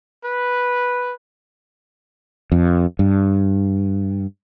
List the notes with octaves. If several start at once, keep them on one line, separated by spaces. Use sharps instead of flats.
B4
F2
G2